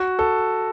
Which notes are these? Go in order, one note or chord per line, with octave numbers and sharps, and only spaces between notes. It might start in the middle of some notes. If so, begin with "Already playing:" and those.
Already playing: F#4
A4